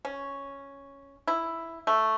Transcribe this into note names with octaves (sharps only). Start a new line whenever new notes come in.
C#4
E4
A3